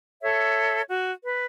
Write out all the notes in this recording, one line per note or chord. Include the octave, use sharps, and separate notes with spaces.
A4 C#5 E5
F#4
B4